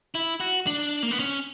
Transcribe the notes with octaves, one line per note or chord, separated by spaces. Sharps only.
E4
F#4
D4
A#3
B3
C#4